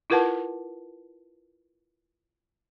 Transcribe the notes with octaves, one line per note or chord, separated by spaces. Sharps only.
E4 F4 A#4 B4 F#5 A5